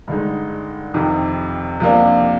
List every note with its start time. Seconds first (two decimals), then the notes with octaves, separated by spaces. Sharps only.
0.08 G2 D3 G#3 D#4
0.94 F2 C3 D#3
1.80 C3 F3 A#3 D4